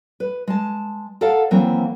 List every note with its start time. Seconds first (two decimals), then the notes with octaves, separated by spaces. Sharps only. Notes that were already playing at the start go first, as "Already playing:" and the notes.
0.20 B4
0.48 G#3 A5
1.21 A4 A#4 D5 F5 F#5 A5
1.51 D#2 E3 F#3 A#3 C4